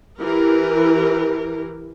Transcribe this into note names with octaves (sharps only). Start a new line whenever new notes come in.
E3 G4 A#4